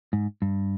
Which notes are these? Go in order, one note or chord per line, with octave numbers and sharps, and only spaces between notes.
G#2
G2